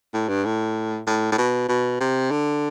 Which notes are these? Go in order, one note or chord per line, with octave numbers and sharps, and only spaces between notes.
A2
G2
A2
A2
A2
B2
B2
C3
D3